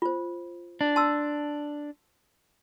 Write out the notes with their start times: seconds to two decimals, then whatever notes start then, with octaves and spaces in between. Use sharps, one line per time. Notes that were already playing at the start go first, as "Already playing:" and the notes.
0.02 F4 C5
0.81 D4
0.96 A5 C6 E6